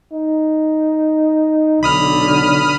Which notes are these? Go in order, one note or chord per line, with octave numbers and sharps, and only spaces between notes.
D#4
B1 D3 B5 D#6 F6